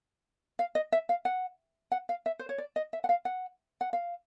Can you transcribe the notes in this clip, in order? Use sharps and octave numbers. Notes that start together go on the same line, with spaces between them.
F5
D#5
E5
F5
F#5
F#5
F5
E5
C5
C#5
D5
D#5
E5
F#5
F5
F#5
F#5
F5